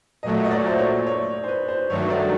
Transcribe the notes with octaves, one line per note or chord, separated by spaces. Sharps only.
A#2 F#3 A3 D#5
D#5
D5
C5
C#5
C#5
C5
B4
C5
G2 D#3 F#3 A3 C#5
D5